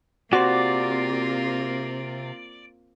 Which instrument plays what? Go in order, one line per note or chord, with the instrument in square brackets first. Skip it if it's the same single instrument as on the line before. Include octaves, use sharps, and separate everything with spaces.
[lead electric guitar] C3 [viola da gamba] A#3 C4 F4 [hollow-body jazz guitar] F#4 C5 [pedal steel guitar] D5